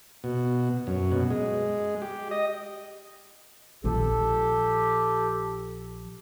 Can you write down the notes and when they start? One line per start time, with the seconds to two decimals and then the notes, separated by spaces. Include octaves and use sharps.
0.24 B2
0.87 F#2
1.12 B2
1.30 G#3
2.02 G4
2.31 D#5
3.84 A#1 F3 G4 A4